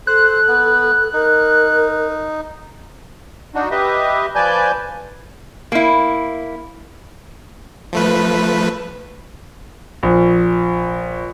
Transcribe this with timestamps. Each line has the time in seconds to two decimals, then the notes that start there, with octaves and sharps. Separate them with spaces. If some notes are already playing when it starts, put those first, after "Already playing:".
0.07 A4 C5 F#6
0.48 B3
1.14 D#4 A#4
3.55 D4 D#4 F#4
3.71 G4 B4 D#5 E5
4.35 F3 B4 D5 G#5 A5 G6
5.72 A#3 E4
7.93 F3 A3 B4
10.03 A#1